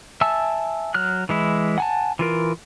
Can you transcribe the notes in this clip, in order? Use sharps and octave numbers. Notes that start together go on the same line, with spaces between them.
E5 G#5 A5 E6
F#3 F6 F#6
E3 G#3 E4
F#5 G#5 A5
E3 F4 A#4